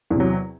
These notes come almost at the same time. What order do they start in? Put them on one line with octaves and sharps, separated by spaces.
E2 C3 F#3